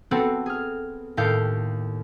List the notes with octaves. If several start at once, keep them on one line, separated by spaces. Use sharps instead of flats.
B3 C4 F#4 A4 B4
G#4 F6
D#2 A2 G4 A4 F5 G6